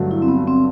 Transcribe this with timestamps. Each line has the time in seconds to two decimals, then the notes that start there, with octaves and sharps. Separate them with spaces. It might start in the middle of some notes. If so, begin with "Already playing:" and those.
Already playing: G2 D3 F#3 A3
0.11 E4
0.22 C4
0.28 B3
0.47 C4